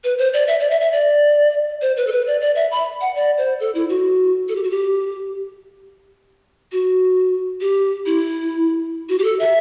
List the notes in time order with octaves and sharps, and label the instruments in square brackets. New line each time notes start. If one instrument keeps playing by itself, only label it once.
[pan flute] B4
C5
D5
E5
D5
E5
E5
D5
C5
B4
A4
B4
D5
D5
E5
B5
F#5
D5
C5
A4
E4
F#4
A4
G4
F#4
G4
F#4
G4
E4
F#4
G4
A4
E5